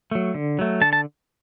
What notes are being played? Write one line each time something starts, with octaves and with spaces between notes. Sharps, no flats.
F#3 A3
D3
F#3 A3
D3 A5
A5